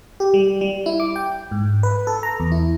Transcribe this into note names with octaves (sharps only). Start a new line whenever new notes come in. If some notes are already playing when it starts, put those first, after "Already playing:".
G4
G3
G3
E4
D6
G5
G#2
B4
A4
A#5
E2
E4